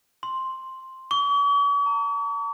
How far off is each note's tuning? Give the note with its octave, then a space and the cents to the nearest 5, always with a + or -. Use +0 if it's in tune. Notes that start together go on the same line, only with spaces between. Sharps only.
C6 +5
C#6 +45
A#5 -40